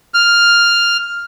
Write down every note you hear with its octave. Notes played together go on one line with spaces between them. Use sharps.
F6